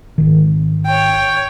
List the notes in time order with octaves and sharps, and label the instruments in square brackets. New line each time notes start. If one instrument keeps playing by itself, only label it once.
[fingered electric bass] G#1 D#3
[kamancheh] C#5 G5